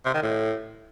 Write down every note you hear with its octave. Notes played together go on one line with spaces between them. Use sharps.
C3
D#3
A2